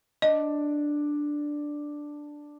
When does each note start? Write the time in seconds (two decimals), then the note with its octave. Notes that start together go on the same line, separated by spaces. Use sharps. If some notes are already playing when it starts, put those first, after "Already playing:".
0.22 D4 D#5